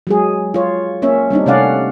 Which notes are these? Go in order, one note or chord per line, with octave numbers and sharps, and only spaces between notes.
F#3 G#3 G#4
F4 C#5
A#3 C#4 C#5 E5
G3 C4 D4 D#4
C3 A3 C#4 D5 F5 F#5